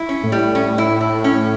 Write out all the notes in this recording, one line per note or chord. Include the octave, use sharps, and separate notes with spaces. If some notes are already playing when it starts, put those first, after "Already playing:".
Already playing: E4
C#4
A2
G3
C#4
E4
E4
C#4